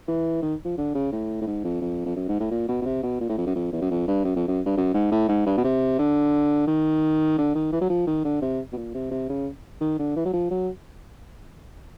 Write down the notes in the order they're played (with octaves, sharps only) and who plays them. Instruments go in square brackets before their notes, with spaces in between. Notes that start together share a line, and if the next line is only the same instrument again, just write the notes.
[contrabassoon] E3
D#3
F3
D3
C#3
A2
A2
G#2
F2
F2
F2
F#2
G#2
A2
A#2
B2
B2
C3
B2
A#2
A2
F2
F#2
F2
E2
F#2
F2
G2
F#2
F2
F#2
G2
F#2
G#2
A2
G#2
G2
B2
C3
D3
D#3
D3
D#3
E3
F#3
F3
D#3
D3
C3
B2
A#2
C3
C3
C#3
D#3
D3
E3
F#3
F3
F#3